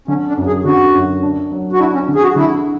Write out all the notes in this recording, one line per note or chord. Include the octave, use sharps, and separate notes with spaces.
D3 C#4
D4
F#2
G#4
D3 F#4
F#2
D4
F#3
F#4
D4 E4
C#4
D3
G#4
F#4
D3 E4